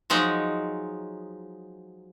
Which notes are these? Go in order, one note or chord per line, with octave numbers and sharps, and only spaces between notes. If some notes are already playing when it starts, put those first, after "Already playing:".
F3 F#3 G#3 D#4